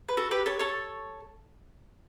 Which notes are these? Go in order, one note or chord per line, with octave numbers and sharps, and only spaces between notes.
B4
F#4 A4
G4 B4
A4 C#5
A4 C#5